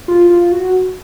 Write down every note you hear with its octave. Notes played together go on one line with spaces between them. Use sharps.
F4
F4
F#4